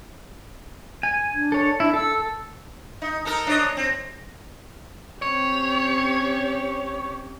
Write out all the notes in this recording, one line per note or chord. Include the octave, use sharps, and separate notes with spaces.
G#5
D4
A4 C#5
D4 E4
A4 E6
D#4
D#4 A4 A#4
D4 C#5 D#5
C4
C4 C#4 G4 C#5